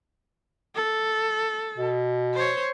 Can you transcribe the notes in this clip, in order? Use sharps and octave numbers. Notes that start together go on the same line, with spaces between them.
A4
B2
C5 C#5